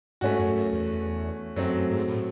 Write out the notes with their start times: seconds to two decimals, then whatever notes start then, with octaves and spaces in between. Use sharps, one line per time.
0.21 G#2 A3 C#4 F#4
0.39 F#2
0.55 F#2
0.72 E2
1.56 F#2 F#3 A3 C4
1.74 F#2
1.90 G#2
2.07 A2